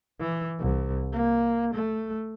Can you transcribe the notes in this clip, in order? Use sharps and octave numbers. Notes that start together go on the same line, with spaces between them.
E3
C2
A#3
A3